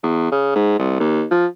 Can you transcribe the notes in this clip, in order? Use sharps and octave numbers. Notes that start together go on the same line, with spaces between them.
E2
C#3
G#2
C2
D#2
F3